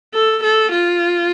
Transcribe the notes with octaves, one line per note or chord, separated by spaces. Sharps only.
A4
A4
F4